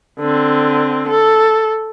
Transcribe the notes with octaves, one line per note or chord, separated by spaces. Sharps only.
D3 C4
A4